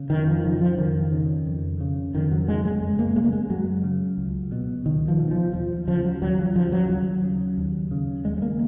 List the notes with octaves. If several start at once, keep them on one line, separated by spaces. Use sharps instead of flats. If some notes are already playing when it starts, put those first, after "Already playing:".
Already playing: C#3
F2 D#3
F3
C#3 F3
F3
F2 D#3
C#3
F2
C#3
F2 D#3
F#3
C#3 G#3
G#3
F#2 G#3
A#3
C#3 G#3
A#3
G#3
F#2 F#3
C#3
C#2
B2
C#2 D#3
F3
B2
F3
D#2 F3
C#3 F3
F#3
D#2 F#3
F3
C#3 F3
F#3
D#2 F#3
C#3
D#2
C#3
D#2 G#3
G#3
A#3